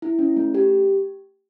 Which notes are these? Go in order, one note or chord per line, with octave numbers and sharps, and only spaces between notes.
E4
C#4
A3
G4